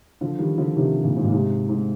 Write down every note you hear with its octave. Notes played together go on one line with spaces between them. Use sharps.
D3 F3
D#3 G3
D3 F3
C3 D#3
A#2 D3
G#2
A#2
G#2 C3
G#2